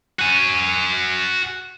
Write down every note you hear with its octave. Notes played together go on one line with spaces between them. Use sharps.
F#4 G#5